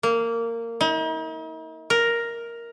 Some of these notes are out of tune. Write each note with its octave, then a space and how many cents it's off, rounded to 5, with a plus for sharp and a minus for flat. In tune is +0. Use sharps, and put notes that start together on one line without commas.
A#3 -15
D#4 +45
A#4 +5